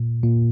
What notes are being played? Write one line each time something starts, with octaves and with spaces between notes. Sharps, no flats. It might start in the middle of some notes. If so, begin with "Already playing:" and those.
Already playing: A#2
A#2